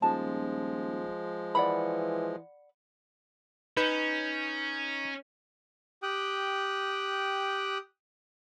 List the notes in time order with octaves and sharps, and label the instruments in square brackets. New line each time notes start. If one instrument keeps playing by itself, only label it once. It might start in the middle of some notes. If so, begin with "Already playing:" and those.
[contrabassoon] D#1 [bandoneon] F3 G#3 [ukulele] A5
[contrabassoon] E3 [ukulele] D5 F#5 B5
[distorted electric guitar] C#4 [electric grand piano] D#4 G6 E7 [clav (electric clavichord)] B4
[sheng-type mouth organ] G4 G5 D#6 F#6